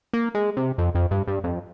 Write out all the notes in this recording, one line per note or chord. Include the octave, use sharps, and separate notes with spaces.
A#3
G#3
C3
F2
F2
G2
G2
F2